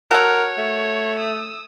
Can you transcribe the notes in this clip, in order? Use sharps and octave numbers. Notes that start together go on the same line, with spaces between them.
F#4 A4 A#4 C#5 F#5
A3
D#6 E6